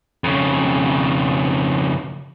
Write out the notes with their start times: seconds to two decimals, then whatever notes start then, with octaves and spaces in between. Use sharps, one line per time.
0.24 F2 C#3